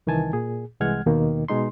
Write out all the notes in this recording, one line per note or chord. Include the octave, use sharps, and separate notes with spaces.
C2 D#3 E3 G#5 A5
A#2 G#4
C2 E3 G#3 F#5 F6 G#6
D#2 B2 D#3 A#3
B2 G#3 D#4 C6